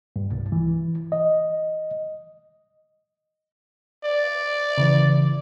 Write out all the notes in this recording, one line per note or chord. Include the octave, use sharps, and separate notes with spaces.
G2
C2
E3
D#5
D5
C#3 E3